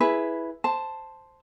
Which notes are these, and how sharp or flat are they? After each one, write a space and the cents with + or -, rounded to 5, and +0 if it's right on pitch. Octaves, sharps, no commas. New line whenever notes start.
E4 +0 G#4 +10 B4 +0
C5 +0 A5 +0